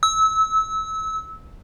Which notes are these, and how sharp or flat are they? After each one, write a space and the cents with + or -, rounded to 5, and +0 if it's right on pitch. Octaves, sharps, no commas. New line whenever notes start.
E6 -25